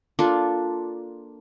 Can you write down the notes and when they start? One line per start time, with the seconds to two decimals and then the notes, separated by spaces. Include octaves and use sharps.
0.19 A#3 D4 F4 A4